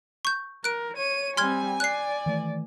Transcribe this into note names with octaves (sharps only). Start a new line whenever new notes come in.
C#6 G6
A#4 F#6 D7
C#5 D#7
G3 C4 G#5 C6 F6 G#6
D5 F#6 C7
D#3 E3 A3